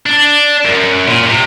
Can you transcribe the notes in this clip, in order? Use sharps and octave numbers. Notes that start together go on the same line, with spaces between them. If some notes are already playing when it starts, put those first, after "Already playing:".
D4
F#2
A#2
C3